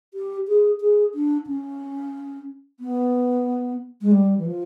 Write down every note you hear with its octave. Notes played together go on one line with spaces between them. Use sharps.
G4
G#4
G#4
D4
C#4
B3
G#3
G3
E3
F3